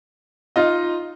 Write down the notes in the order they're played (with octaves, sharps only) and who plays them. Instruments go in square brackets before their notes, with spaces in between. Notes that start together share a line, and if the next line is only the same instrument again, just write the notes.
[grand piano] D#4 F4 D#5